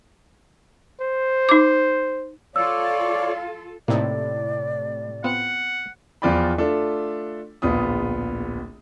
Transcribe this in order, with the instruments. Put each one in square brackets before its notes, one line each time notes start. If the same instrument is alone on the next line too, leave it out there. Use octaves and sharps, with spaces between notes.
[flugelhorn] C5
[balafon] D#4 D6
[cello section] F4 A4 [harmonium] C#5 D5 [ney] F5 [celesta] E6
[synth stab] A2 C3 [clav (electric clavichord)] A#3 C4 D#4 [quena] D5
[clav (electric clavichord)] B3 C4 F4 [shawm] F#5
[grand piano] E2 F3 F4 D5 G5 B5
A3 D4 F4 A4
D1 A#1 B3 F4 D#6